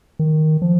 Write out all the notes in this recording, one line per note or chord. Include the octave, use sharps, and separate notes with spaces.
D#3
F3